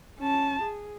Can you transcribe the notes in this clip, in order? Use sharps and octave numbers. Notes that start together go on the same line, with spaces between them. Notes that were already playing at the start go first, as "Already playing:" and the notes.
C#4 A5
G#4